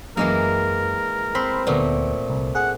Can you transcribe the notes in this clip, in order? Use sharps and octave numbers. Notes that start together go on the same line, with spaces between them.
F#2 E3 G#3 A#3 A#4
C4 B5 C6
D2 A#2 A3 B3
C2
G#4 F#5